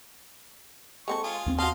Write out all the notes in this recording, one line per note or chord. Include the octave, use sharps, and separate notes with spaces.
G#3 C4 A4 C#6
F4 G#4
D#2 B3 C4
F#4 D#5 F5 A5 C6